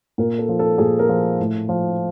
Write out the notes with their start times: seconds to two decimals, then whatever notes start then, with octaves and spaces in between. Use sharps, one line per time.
0.18 A#2 A#4
0.38 A4
0.49 F3
0.59 A4
0.78 A#2 G#4
0.99 A#4
1.09 F3
1.39 A2
1.69 F3